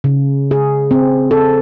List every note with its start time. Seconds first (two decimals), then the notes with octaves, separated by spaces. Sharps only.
0.04 C#3
0.51 G#4
0.91 C4
1.31 A4